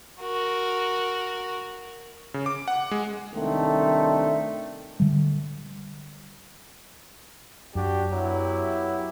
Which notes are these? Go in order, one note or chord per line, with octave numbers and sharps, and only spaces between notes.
F#4 A#4
C#3
D6
F#5
G#3
C2 D#3 A3 C4 D4 D#4
D3 G3
F#2 D4 F#4 G4
F#3 B3 E4 G4